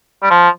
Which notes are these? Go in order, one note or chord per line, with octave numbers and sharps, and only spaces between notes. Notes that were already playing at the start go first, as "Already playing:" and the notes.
G3
F3